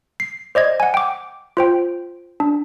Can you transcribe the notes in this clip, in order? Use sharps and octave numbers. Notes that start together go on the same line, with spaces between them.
C7
C5 D5 D#5 G#6
F#5 G#5
G5 D6
F4 C5 G5
D4